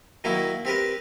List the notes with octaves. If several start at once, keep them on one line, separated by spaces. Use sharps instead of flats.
D#3 F#3 A#3 E4
C4 G4 A#4 B4